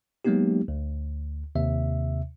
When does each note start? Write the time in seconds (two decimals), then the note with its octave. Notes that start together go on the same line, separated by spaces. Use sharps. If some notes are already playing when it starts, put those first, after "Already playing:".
0.25 F#3 G#3 A#3 B3 D#4 G4
0.68 D2
1.55 D#2 C3 E5